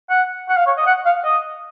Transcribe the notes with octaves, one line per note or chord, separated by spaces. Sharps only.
F#5
F#5
F5
C#5
D#5
F#5
F5
D#5